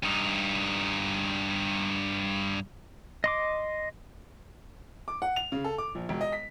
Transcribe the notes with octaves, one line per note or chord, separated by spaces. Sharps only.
G2 D#4
D#5 C6 D6
D6
F#5
F7
C#3
A4
D6
A#1
E1
D#5
B6